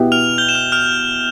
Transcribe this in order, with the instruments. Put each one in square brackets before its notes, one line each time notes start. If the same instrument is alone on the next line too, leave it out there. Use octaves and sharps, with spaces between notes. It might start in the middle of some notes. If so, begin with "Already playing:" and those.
Already playing: [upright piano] B2 B3 E4 G4
[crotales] F6 F7
G6 G7
E7
F6 F7
F6 F7